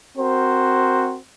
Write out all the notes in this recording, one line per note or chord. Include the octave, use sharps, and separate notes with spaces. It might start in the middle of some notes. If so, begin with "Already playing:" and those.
C4 F#4 A#4 C5